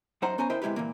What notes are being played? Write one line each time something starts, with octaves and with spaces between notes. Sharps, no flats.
F#2 D#4 C5 F#5 A#5
B3 C#4 C5 G#5 A#5
E4 A#4 C5 D#5 E5 G5
C3 G#3 E4 G4 B4
A#2 E3 A#3